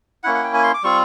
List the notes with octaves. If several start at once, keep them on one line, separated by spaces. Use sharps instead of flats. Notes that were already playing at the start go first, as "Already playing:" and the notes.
A#3 C#4 E4 F#5
F#5
G5
G#5
C6
D6
G3 C4 F4 C#6